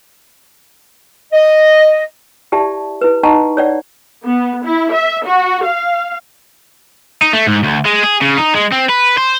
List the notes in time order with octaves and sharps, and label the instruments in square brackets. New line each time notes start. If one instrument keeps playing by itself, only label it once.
[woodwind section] D#5
[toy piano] E4 G4 D5 E5 A5
E4 B4
D#4 D#5 F#5 A5 A#5 C#6
C#5 D5 F#5
[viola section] B3
E4
E5
F#4
F5
[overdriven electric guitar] D#4
A3
G#2
D2
G#3
G#4
C#3
D#4
G#3
C4
B4
C5